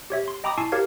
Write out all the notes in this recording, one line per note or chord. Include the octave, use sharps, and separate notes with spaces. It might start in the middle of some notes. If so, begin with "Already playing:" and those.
G4 C#5 E5
C6
D#5 G5 A#5 B5 D6 D#6
E4 G#5 A5 C#6 E6 C7
G4 A#4 C#5 F5 G#6